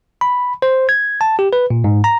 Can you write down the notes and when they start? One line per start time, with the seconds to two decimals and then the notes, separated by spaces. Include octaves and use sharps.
0.21 B5
0.62 C5
0.89 G#6
1.21 A5
1.39 G4
1.53 B4
1.70 A#2
1.84 G#2
2.04 A#5